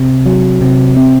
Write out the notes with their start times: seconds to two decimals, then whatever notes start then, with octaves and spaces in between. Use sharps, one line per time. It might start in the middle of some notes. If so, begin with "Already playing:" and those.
Already playing: C3
0.26 F#3
0.61 C3
0.96 C4